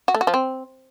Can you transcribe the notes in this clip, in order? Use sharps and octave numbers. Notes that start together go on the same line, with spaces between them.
F#4
A3
F#4
F3
C4